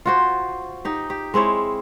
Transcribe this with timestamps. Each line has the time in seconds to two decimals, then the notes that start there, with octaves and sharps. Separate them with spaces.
0.06 F4 F#4 C5
0.85 D#4 G4
1.10 G4
1.34 G#3 C4 E4 C#5